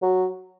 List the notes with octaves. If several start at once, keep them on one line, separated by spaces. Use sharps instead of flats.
F#3